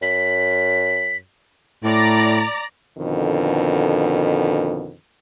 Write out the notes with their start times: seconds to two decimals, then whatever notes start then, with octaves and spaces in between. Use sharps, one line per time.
0.02 F#2 B6
1.84 A2 D5 A#5
2.99 F2 B2 D3 D#3